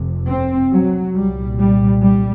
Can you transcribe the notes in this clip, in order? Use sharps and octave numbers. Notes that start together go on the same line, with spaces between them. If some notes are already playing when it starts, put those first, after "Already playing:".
Already playing: F1 F2 C3
C4
F#3
C2 A#2 G3
G3
G3